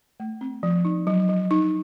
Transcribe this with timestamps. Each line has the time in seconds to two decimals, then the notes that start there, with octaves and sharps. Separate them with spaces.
0.20 A3
0.41 C4
0.63 F3
0.85 D#4
1.07 F#3
1.29 F#3
1.51 D#4